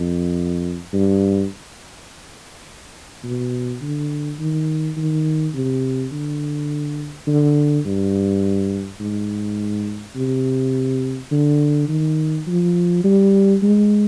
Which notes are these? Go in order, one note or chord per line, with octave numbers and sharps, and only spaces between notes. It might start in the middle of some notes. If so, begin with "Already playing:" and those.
Already playing: F2
G2
B2
D3
D#3
D#3
C3
D3
D3
G2
G#2
C3
D3
D#3
F3
G3
G#3